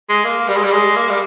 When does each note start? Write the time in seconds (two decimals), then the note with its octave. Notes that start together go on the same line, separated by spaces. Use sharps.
0.09 G#3
0.24 A#3
0.48 G3
0.56 G#3
0.63 G3
0.72 G#3
0.96 A#3
1.09 G3